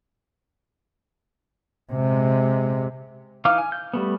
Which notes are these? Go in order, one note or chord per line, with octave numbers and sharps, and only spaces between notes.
C3 G#3
E3 D#4 F5 D6 F6
G#5
G6
G3 A3 B3